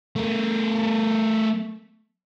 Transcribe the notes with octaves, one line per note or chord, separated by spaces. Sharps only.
A3 A#4